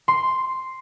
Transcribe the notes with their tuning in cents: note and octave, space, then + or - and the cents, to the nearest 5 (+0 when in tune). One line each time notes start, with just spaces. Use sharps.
C6 +0